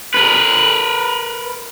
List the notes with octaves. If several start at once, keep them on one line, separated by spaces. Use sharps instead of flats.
A#4 B4